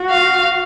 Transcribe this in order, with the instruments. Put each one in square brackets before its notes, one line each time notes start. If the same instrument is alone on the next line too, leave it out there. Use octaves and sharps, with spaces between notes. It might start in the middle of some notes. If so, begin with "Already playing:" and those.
Already playing: [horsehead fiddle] F#4
[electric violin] F5